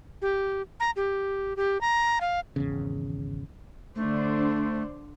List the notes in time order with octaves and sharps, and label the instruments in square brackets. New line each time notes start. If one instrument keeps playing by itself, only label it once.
[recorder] G4
A#5
G4
G4
A#5
F5
[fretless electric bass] G#1 E2 C#3
[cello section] D3 D4 C5 [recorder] A3